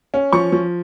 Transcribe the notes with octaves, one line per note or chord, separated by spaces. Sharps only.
C#4
F3 C#6
F3